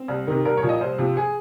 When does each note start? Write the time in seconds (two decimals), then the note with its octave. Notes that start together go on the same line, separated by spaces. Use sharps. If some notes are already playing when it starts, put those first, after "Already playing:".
Already playing: C4
0.08 C2
0.27 C3 D#3
0.45 C2 A#4
0.57 C#5
0.62 A#2 F3
0.69 D#5
0.81 C2 C5
0.98 C3 F3
1.17 G#4